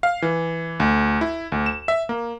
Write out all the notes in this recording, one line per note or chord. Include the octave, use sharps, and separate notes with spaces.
F5
E3
D2
E4
D2
E7
E5
A#3